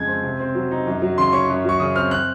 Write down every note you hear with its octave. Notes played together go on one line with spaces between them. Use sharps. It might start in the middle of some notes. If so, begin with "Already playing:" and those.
Already playing: F2 C#3 G#3 G#6
C4
C3
C4
F#3
D#4
F#2
F#3
C#3 C6
C#4 C#6
F#2
F#3 C#6
C#3 D#6
C4 F6
F#6